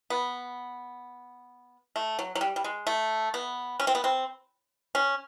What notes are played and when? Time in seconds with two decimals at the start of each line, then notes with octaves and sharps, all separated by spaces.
0.10 B3
1.96 A3
2.19 F#3
2.35 F#3
2.41 G3
2.56 G3
2.64 G#3
2.87 A3
3.34 B3
3.80 C#4
3.87 C4
3.95 B3
4.04 C4
4.95 C#4